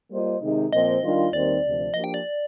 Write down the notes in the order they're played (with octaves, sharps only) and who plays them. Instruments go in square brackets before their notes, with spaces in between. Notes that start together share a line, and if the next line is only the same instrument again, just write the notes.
[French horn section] G3 A#3 F4 C5 D#5
C3 D#3 G#3 D#4
[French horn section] A#2 F3 C4 [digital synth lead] D#5
[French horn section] D#3 G3 D4 F4
[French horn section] D#2 D#3 G3 C4 [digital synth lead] D5
[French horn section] D2 C3 F3
[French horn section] F3 A#3 D4 G4 [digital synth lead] D#5
[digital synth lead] G5
D5